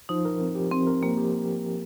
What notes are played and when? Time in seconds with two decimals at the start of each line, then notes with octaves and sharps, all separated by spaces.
0.09 F3 D#4
0.25 A#4
0.41 C4
0.55 G4
0.71 F3 C4
0.87 A#4
1.02 A#3 C4
1.17 G4